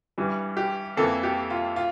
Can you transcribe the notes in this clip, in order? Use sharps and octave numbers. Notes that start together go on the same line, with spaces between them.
G2 E3 G3
G4
F2 E3 A#3 A4
G4
F4
F4